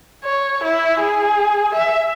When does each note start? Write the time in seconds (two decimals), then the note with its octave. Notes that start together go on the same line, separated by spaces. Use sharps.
0.24 C#5
0.64 E4
1.00 G#4
1.74 E5